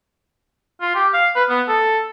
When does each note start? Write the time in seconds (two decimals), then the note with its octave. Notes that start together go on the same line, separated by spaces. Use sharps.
0.81 F4
0.95 G4
1.14 F5
1.36 B4
1.49 B3
1.68 A4